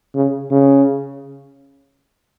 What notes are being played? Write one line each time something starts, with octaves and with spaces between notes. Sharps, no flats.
C#3
C#3